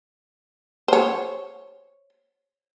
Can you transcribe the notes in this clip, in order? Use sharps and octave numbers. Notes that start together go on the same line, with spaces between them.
C5 C#5